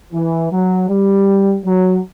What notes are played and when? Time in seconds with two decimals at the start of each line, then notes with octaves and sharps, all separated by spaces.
0.13 E3
0.52 F#3
0.89 G3
1.65 F#3